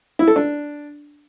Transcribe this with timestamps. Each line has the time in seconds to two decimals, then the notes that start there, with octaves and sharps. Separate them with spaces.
0.19 E4
0.28 A4
0.36 D4